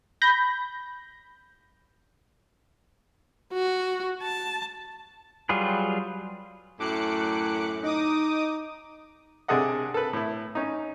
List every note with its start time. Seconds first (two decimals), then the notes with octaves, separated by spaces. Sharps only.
0.22 B5 G6 A#6
3.53 F#4
4.23 A5
5.49 F#3 G3 F4 G#4 B4
6.80 F#2 A2 D6 F#6 C#7
7.83 D#4 D6 D#6
9.48 C3 D4 G#4 A4 D#5 F#5
9.94 A4 B4
10.13 A2 E4
10.55 C#4 D#4